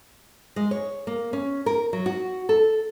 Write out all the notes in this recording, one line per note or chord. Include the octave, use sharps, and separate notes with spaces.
G#3
C#5
A#3
C#4
A#4
F#3
F#4
A4